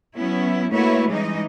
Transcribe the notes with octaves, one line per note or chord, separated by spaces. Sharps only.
F#3 B3 C#4 E4
A3 A#3 E4 F#4 B4 C#5
E3 G3 G#3 C#4 D#4 D#5